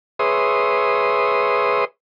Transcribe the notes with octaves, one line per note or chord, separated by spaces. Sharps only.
G#4 B4 C#5 E5 C6 D#6